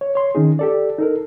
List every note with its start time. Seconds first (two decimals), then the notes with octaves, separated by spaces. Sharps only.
0.01 C#5
0.15 C#5 C6
0.35 D#3 C#4 D#4 G#4
0.59 G4 A4 D5
0.99 D#4 A4 A#4